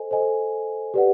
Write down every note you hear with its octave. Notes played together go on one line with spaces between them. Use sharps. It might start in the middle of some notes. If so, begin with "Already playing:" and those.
Already playing: A4 C5 D#5 G#5
A4 C5 D#5 G#5
G4 B4 D5 F#5